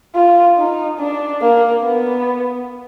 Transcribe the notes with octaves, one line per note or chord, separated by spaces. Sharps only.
F4
D#4
D4
A#3
B3